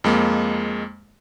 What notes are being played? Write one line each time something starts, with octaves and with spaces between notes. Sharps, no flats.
F2 G#3 A#3